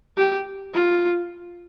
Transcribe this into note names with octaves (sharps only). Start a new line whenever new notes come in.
G4
F4